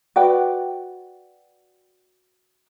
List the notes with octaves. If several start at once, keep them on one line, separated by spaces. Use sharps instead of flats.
F#4 B4 D5 G5